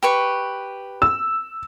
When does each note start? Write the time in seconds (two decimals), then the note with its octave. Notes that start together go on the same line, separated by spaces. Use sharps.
0.03 G4 B4 C#6
1.02 E6